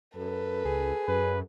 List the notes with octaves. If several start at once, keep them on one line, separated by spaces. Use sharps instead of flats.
F#2 A4 B4
C#2 G#4
F#2 B4